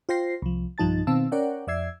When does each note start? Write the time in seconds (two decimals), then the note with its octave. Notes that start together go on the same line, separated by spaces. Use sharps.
0.09 F4 C5 G5 A#6 C7
0.42 C2 F3
0.78 B1 G2 F3 D#4 A5 A6
1.07 B2 D#3 C4 F5 A5 E6
1.32 C#4 A#4 C#5 D5 F#5 G5
1.67 F2 D5 E5 E6 G#6 C7